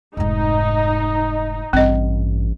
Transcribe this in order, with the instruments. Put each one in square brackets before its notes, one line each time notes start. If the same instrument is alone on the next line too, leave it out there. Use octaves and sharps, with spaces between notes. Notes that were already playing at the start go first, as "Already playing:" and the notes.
[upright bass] F1 G#2 [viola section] D#4
[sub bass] A1 [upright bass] G2 [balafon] C4 D#5